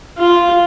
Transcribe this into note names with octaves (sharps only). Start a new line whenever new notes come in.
F4